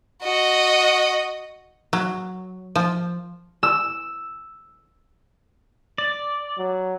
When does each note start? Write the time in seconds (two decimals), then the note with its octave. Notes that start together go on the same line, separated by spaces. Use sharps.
0.22 F#4 D#5
1.93 F#3
2.75 F3
3.63 E6
5.98 D5
6.58 F#3